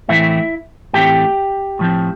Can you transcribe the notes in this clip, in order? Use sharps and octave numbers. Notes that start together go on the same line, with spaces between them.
A2 E3 A3 C4 E4 E5
A2 E3 A3 C4 G4 G5
A2 F3 C4